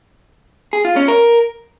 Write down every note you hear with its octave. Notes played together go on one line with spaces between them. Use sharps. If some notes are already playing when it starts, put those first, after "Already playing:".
G#4
F4
C#4
A#4